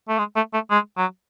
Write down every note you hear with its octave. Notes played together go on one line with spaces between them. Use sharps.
A3
G#3
A3
A3
G#3
F#3